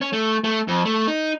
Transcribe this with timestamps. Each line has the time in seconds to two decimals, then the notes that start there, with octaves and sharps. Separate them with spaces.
0.01 C#4
0.13 A3
0.44 A3
0.68 F2
0.85 A3
1.08 D#4